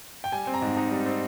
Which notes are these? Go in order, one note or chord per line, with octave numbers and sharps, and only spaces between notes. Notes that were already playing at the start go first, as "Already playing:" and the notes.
G5
G3 G#5
C4
A#5
G#2
D#4 A#5
G3
C4